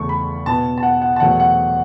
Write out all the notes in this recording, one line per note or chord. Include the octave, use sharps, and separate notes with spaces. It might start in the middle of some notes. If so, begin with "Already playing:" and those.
Already playing: E2 C#3 A3 C#6
B5
B2 B3 A5
A5
F#5
F#5
A5
E2 B2 F#3 A3 F#5
F#5